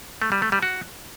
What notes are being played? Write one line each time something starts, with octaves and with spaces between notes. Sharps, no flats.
A3
G3
A3
G3
F#4